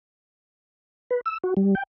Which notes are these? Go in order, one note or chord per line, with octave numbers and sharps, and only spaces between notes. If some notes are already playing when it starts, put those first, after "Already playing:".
B4
E6
F#4
G3
G5